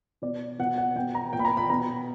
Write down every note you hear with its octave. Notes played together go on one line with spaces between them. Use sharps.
B2 D5
B2 F#5
F#5
B2 G5
A#5
A#2 G5
B5
A#5
B5
B2 A#5